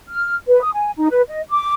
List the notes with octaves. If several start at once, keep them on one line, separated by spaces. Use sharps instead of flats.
F6
B4
D#6
G#5
D#4
B4
D#5
D6